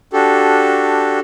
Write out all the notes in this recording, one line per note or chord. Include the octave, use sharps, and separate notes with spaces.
D4 F#4 G4 A4